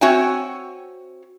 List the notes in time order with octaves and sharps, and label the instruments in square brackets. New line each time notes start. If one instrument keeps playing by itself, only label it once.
[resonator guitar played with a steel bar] C4 F#4 C#5 E5 G5 G#5